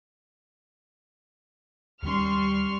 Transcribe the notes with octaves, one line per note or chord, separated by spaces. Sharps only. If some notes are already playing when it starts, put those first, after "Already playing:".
D#2 D#3 G3 C#4 C6 C#6 F6